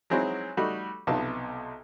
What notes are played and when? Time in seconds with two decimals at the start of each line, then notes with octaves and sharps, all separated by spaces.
0.10 F#3 G#3 C4 D#4 E4 F#4
0.57 G3 A3 D#4 F#4
1.07 B1 C3 B3 D#4 F4 A5